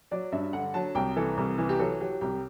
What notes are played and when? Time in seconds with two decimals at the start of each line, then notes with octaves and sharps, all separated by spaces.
0.11 F#3 D5
0.32 G2 E5
0.53 D3 F#5
0.74 F#3 A5
0.95 C2 G5
1.16 E3 A4
1.37 C2
1.58 E3
1.69 G4
1.79 F#3 A4
2.00 F#3 G4
2.21 C2 G4